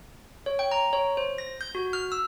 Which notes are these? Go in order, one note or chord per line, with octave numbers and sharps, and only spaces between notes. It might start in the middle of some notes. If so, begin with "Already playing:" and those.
C#5
G5
A#5
C#5
C5
A#6
G6
F#4
F6
E6